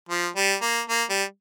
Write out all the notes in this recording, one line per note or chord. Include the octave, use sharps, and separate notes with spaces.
F3
G3
A#3
A#3
G3